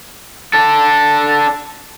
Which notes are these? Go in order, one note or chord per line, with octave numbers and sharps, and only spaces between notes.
D4 A4